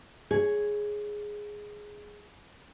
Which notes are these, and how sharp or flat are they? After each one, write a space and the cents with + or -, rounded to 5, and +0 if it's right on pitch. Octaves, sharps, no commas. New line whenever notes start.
G#4 +0 C#5 +0